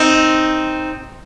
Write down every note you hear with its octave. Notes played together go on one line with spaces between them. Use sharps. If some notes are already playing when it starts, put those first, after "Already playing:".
Already playing: C4 D#4